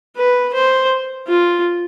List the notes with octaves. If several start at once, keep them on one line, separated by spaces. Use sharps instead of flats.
B4
C5
F4